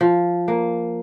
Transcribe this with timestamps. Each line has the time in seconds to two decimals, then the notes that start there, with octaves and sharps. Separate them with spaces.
0.01 F3
0.48 A#3